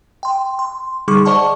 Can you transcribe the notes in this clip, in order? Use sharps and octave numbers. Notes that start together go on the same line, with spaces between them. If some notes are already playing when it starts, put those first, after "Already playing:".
G5 C6
C6
D3 G3 D#4 G#4 C#6 D6
C5 D5 D#5 F#5 A5 C#6